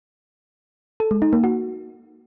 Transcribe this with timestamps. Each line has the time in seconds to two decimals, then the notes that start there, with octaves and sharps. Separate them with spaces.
1.00 A4
1.11 G#3
1.22 D#4
1.33 A#3
1.44 F#4